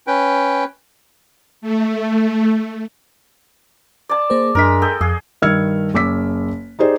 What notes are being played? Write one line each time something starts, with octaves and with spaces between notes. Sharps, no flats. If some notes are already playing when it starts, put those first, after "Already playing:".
C#4 B4 G5
A3
D5 A5
A#3 G#4 C5
F#2 G#3 D4 A#4 B6
A4 D#5 G5
F2 G#4
G2 D#3 E6 F6 G#6 C#7
F#1 C#4 D6 E6 B6
D#4 G4 G#4 C5 D5